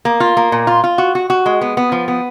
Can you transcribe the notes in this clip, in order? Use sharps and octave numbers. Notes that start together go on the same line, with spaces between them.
A#3
F4
A#3
A#2
F4
F4
F#4
F#4
F#4
G#3
B3
B3
F3
B3